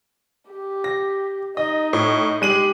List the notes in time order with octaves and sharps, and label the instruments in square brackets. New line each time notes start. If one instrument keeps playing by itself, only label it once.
[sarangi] G4
[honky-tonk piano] A#6
[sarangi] D#4 [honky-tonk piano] D#5
[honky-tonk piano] A2
[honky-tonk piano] G#3 D#7 F#7 [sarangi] G4